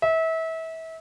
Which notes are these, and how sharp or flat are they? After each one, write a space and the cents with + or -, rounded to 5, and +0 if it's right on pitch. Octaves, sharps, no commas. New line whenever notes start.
E5 -30